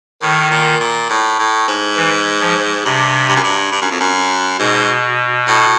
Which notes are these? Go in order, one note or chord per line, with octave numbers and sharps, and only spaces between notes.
A2 D#3
A#2
A#2
A2
A2
G#2
E3
F3
G2 C3
G2
F#2
G2
G2
F#2
F2
F#2
G#2 B2
A2